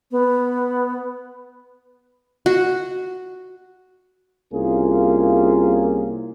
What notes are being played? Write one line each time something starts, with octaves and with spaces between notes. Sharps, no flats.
B3
F#4
C2 A#3 C#4 F4 G#4